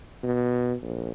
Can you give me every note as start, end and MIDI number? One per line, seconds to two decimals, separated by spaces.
0.23 0.74 47
0.82 1.11 34